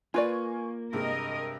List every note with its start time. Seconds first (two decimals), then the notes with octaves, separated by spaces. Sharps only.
0.14 A#3 F4 B4 D5 G#5 C#6
0.93 G2 C3 G#3 A#4 D#5